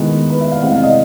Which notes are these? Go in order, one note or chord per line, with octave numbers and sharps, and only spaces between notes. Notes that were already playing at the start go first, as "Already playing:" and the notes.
Already playing: D#3 G#3 B3 E4
B4
E5
F5
C3 E3 G#3 C4 F#5
F5
D#5